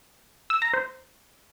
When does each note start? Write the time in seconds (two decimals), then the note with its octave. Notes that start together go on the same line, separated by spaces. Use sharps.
0.50 E6
0.62 A#5
0.74 C5